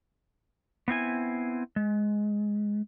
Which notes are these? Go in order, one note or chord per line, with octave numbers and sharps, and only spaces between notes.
B3 C4 E4 G#5
G#3